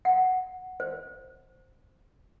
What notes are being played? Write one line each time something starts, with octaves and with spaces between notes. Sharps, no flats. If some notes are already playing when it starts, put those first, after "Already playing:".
F#5
C5